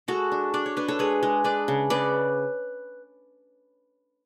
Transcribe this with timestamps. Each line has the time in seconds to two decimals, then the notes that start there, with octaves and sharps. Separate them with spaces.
0.08 G#3 F#4 A4
0.32 D4
0.54 D4 D5
0.66 C#5
0.77 D4 B4
0.88 A4 C#5
0.99 G#3 G#4 B4
1.23 G#3
1.44 D4 B4 D5
1.68 C#3
1.90 C#3 B4 D5